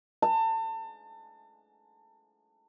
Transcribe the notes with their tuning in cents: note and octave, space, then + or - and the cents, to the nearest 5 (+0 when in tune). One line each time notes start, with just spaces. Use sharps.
A5 +35